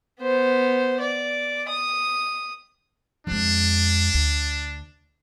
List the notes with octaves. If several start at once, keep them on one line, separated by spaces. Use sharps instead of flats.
B3 C5
D5
D#6
F2 G#3 D4
D2